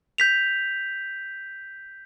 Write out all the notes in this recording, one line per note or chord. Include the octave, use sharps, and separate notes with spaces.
G6 B6 F7